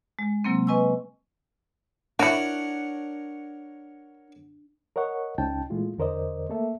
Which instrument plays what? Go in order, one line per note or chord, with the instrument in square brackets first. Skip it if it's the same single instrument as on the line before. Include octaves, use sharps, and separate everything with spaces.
[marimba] G#3
C3 F#3 A#3 C4
B4 D#5 G#5 C#6 E6
[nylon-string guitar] D4 [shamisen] E4 F#4 [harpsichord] A#4 C#5 F#5
[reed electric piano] A#4 C#5 D#5 F#5 C#6
C#2 C#4 D#4 G5 A5
A#2 E3 G#3 A3 F4
E2 D3 A#4 C5 D5 D#5
A3 A#3 A4 E5